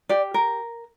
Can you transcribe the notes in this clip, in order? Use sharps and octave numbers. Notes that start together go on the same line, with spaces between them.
G4 D5
A#4